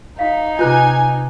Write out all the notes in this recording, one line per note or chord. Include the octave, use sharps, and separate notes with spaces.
D#4 F5 B6
C3 F4 B4 G#5 F#6 G6